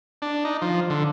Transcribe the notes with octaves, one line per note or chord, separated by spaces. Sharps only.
D4
D#4
F3
D3